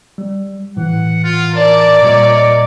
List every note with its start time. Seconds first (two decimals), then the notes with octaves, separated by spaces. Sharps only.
0.18 G3
0.77 A2 E3 F#5
1.24 F4
1.55 A#4 D5 A5
2.03 A#2 G3 C#5 D#5